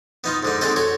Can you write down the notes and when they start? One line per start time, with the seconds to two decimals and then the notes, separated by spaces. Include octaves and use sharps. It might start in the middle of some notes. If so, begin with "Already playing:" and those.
0.24 B3 D#4 F4
0.43 G#2 D3 D#4
0.61 D3 G#3 C4 D#4 A4 C5
0.76 F#4 A4 C#5